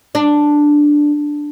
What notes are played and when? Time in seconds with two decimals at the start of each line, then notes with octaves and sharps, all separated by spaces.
0.15 D4